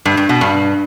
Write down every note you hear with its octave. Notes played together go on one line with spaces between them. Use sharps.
G2
G2
B2
G2